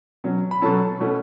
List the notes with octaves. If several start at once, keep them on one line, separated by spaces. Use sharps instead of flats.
B2 F#3 C#4
B5
B2 F#3 C#4 A4 A5
B2 A3 C#4